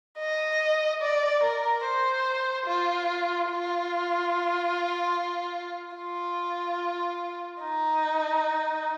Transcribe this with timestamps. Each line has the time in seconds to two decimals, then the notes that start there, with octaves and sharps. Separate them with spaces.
0.19 D#5
1.03 D5
1.43 A#4
1.85 C5
2.67 F4
3.50 F4
5.97 F4
7.62 D#4